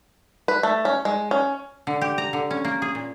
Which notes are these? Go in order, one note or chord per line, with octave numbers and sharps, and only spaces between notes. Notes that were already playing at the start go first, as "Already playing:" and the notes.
B4
A3
C#4
G#3
C#4
D3
G4
A#5
D3
C#4
A#3
G#4
A#2